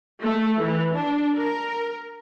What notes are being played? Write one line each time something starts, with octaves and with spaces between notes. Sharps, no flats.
A3
E3
D4
A#4